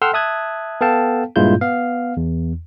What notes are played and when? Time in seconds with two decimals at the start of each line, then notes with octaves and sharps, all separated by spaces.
0.02 A4 F#5 G5 C6 E6 F6
0.13 E5 A5 D#6 F#6 G#6
0.81 B3 A4 F5 G5 A5
1.36 G2 A#2 G#3 E4 F4 G6
1.61 B3 F5
2.17 E2